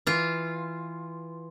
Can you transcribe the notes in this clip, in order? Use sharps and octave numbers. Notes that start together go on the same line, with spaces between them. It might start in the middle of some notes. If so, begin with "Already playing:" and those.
E3 F4